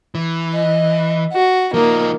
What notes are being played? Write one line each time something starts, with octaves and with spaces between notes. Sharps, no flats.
E3
D#5
F#4
F3 A#3 D#4